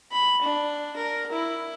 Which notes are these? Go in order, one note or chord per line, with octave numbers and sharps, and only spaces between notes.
B5
D4
A#4
E4